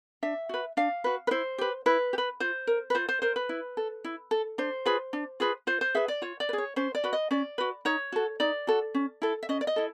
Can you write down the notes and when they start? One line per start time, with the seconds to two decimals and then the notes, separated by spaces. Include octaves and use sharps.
0.23 D4 E5
0.49 F#4 B4
0.77 D4 F5
1.04 F#4 B4
1.27 B4
1.31 E4 C5
1.58 G4 B4
1.86 E4 B4
2.13 G4
2.18 B4
2.40 F4 C5
2.67 A#4
2.90 B4
2.95 F4 C5
3.09 C5
3.22 A#4 C5
3.36 B4
3.49 E4
3.77 A4
4.04 E4
4.31 A4
4.58 D4 C5
4.86 F4 G#4 B4
5.13 D4
5.40 F4 G#4 B4
5.67 F4 C5
5.81 C5
5.95 G#4 B4 E5
6.08 D5
6.22 F4 C#5
6.40 D5
6.49 B4
6.53 G#4
6.58 C#5
6.76 C#4 C5
6.95 D5
7.04 F#4 B4
7.13 D#5
7.31 C#4 D5
7.58 F#4 B4
7.85 D#4 C#5
8.12 F#4 A4
8.40 D#4 D5
8.67 F#4 A4
8.94 C#4
9.22 E4 A4
9.43 E5
9.49 C#4 D#5
9.61 D5
9.67 D#5
9.76 E4 A4